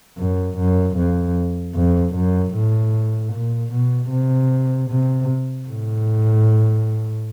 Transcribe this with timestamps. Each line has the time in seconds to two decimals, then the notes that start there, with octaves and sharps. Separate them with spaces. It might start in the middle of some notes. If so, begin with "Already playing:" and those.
0.18 F#2
0.57 F#2
0.97 F2
1.75 F2
2.14 F#2
2.53 A2
3.32 A#2
3.71 B2
4.10 C3
4.89 C3
5.67 A2